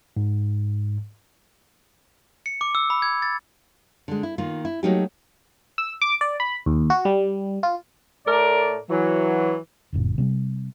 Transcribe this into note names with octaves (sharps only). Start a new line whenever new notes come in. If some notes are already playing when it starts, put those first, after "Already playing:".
G#2
C#7
D6
E6
B5
G#6
A6
D3 G#3
E4
D#3 A#3 F4
E4
F#3 A3 A#3 D#4 F#4 G4
E6
D6
D5
B5
D#2
F#4
G3
F4
A2 A3 A#4 D5
E3 F#3
D1 G1 F#2 A#2
C3 G3 G#3 C4